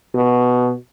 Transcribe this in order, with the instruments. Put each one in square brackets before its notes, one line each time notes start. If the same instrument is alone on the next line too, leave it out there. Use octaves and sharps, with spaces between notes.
[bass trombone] B2